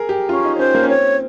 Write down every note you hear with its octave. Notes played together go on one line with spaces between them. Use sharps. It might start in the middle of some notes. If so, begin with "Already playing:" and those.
Already playing: G#4 A#4
G4
C#4 F4
D#4
C#5
C#4 C5
A#3
C#4
C4 C#5